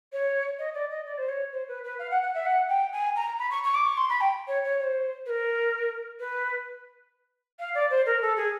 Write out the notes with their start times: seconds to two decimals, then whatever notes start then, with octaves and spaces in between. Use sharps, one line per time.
0.12 C#5
0.59 D#5
0.74 D5
0.90 D#5
1.05 D5
1.18 C5
1.28 C#5
1.52 C5
1.68 B4
1.83 B4
1.99 F5
2.11 F#5
2.22 F#5
2.34 E5
2.45 F#5
2.68 G5
2.92 G#5
3.16 A#5
3.39 B5
3.50 C#6
3.64 C#6
3.74 D6
3.86 C#6
3.97 C6
4.09 B5
4.20 G5
4.47 C#5
4.64 C#5
4.79 C#5
4.83 C5
5.26 B4
5.29 A#4
6.19 B4
7.59 F5
7.74 D5
7.90 C5
8.06 A#4
8.21 A4
8.37 G#4